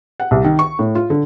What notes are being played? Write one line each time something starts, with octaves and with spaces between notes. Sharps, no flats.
F#5
C2
D#3
C#6
A2
F4
D3